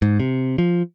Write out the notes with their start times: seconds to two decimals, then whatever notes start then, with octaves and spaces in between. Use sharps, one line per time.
0.02 G#2
0.20 C3
0.58 F3